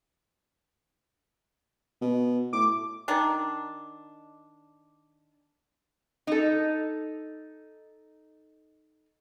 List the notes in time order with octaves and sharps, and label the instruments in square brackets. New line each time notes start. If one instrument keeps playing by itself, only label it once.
[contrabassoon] B2
[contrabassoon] A2 [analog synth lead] D6
[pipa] D#3 D4
[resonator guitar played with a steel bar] D#4 A4